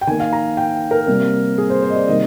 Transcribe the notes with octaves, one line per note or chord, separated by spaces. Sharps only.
G5
D#3 A#3 G#5
F5
A#5
G5
A#4
C3 G3 A#3
G#4
C5
C5
D#5
D5
C3 D#3 G3 A#3 D#5